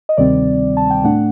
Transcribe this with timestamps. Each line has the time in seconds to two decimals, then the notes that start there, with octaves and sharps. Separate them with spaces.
0.09 D#5
0.17 D2 C3 D#3 G3 C4 D5
0.77 A5
0.91 G5
1.04 A2 A3 D4 F#5